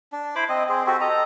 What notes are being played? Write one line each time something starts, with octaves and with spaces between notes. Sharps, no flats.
D4
E4 C5 B5 D6
C4 D#5
C4 G#4
C4 F#4 G4 A4
A4 D#5 A#5